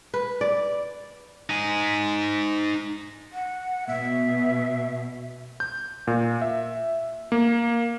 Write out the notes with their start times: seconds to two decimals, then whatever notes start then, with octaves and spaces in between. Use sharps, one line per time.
0.14 B4
0.41 D5
1.50 D#4 G#5
3.33 F#5
3.87 B2 E5
5.60 G6
6.07 A#2
6.42 E5
7.32 A#3